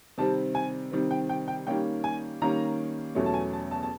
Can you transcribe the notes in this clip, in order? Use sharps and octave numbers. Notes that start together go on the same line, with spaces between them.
C3 D#3 G3 C4 A5
G#5
C3 D#3 G3 C4
G5
G5
G5
D#3 G3 A#3 C#4 G5
G#5
D#3 G3 A#3 C#4 A#5
E2 B2 F#3 A3 C#4
A5
G#5
A5
A5
A5